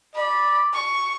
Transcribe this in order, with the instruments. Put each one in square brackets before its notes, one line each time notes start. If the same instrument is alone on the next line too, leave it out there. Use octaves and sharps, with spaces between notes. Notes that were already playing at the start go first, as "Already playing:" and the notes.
[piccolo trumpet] D5 [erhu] B5
[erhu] C#6